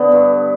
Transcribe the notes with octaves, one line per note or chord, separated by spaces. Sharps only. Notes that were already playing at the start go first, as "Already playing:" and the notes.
Already playing: D3 B3
G2